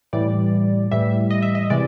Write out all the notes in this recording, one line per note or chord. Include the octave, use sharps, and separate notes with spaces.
A2 E3 G3 D5
A2 E3 G3 E5
D#5
E5
D#5
C3 E3 G#3 D5